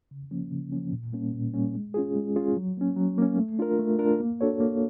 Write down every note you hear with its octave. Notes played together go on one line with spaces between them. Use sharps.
C#3
F3 A#3 C#4
C#3
F3 A#3 C#4
A#2
G3 A#3 C#4
A#2
G3 A#3 C#4
G#3
C#4 F4 G#4
G#3
C#4 F4 G#4
F#3
A#3 C#4
F#3
A#3 C#4
A3
D4 F4 A#4
A3
D4 F4 A#4
A#3
D4 F#4 A4 C#5
A#3